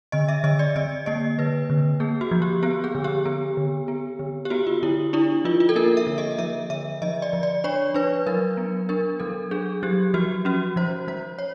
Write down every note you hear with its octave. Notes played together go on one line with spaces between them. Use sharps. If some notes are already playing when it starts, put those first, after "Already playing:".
D3 D#5
E5
D3 D#5
D5
D3 D#5
A#3 D#5
D3 B4
D3
A#3 G#4
F#4
F3
G4
B3 G4
G#4
D3
G4
B3
D3
B3
D3
G4
B3 F#4
F4
D3 E4
D4 E4
F3 F4
F4
A4
A#3 A#4
E5
D3
D#5
F3 E5
D3 E5
F3 D#5
D5
F3
D5
D4 C#5
D4 B4
F#3 A#4
B3
D4 A#4
F#3 A4
D4 G#4
F#3 G4
F3 F#4
C#4 F#4
F3 C5
F3 C5
C#5